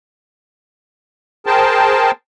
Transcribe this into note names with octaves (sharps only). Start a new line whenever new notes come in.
G#4 A#4 C5 G5 A5